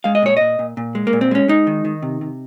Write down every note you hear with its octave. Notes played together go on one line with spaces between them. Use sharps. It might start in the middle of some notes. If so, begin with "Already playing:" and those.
G#3 F5
D#5
A#2 C#5
A#2 D#5
A#2
A#2
G#3
A#3
A#2
C4
G#3 C#4
G#3 D#4
D#3
D#3
C3
C3